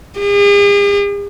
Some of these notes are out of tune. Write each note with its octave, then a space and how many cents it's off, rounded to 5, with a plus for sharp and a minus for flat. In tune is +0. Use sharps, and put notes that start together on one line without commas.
G#4 -45